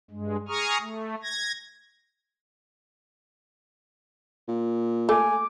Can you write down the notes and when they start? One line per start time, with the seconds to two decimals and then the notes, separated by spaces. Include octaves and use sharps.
0.11 G2 G#3
0.48 G#4 A#5 C#6 D#6 F6
0.81 A3
1.23 G#6 A#6
4.48 A#2
5.09 A3 G#5 D6